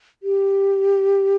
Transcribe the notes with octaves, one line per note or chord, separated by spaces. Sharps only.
G4